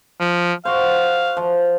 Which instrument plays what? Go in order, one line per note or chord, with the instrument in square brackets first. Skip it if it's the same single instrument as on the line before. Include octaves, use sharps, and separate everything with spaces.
[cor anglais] F3
[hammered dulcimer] F#4 C5 [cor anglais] F5
[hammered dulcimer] F3